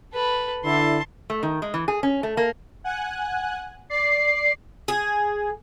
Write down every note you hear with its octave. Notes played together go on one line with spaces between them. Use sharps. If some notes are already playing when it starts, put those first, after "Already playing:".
A4 B4
D3 E4 A5 C6
A3
D#3
G#3
E3
G#4
C#4
A3
A#3
F#5 G#5 F#6
D5 C7
G#4